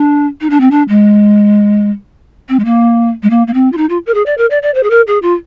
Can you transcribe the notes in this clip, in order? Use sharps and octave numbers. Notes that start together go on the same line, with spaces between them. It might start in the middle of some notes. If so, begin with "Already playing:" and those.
Already playing: D4
D#4
D4
C4
D4
G#3
C4
G#3
A#3
G#3
A#3
A#3
C4
F4
D#4
F4
A#4
G#4
D5
A#4
D5
D5
C5
G#4
A#4
G#4
F4